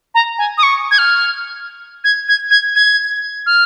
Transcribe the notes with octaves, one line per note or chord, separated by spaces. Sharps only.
A#5
G#5
D#6
C#6
G#6
F6
G#6
G#6
G#6
G#6
F6